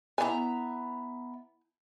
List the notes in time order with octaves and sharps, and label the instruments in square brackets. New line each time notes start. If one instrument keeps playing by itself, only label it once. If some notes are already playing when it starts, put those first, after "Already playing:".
[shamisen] E3 G#5 [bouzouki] B3 E5 A#5